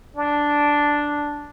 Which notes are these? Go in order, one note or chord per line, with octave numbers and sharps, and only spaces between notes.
D4